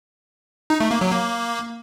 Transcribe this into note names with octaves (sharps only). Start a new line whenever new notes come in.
D#4
A3
A#3
F#3
A#3